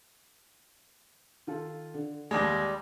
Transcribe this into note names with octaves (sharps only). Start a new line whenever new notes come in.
D#3 F4 A4
D3
D#2 G3 G#3